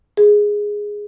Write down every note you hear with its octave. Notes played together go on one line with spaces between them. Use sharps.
G#4